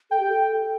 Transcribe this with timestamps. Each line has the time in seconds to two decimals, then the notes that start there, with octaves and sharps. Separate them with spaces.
0.11 A4 G5
0.20 G4
0.30 A4